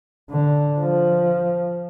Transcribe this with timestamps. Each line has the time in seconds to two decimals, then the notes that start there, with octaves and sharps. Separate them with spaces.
0.30 D3
0.80 F3